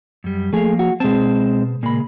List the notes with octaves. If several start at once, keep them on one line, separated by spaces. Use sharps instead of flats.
F#2 G3
F3 A3 A#3 G#4 F5
F#4
B2 G#3 C4 C5 A5
A#2 C#3 G#3 A#3 B5